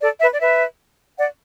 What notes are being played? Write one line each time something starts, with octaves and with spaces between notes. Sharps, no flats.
A4 D5
B4 E5
D5
B4 E5
D5 F#5